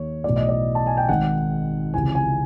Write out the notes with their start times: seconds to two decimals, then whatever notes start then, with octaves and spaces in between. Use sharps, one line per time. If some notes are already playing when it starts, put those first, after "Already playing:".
Already playing: D#2 D#3 C#5
0.24 B1 A2 E3 D5
0.36 D#5
0.49 D5
0.75 A5
0.87 G#5
0.97 G5
1.09 G#1 G#2 D#3 F#5
1.93 C#2 C3 E3 G#5
2.15 G#5